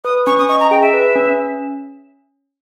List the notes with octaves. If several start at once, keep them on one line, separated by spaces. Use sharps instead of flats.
B4 D#6
C#4 C#6
D#6
D#5 C#6
A#5
G#4 G5
E5
B4
C#4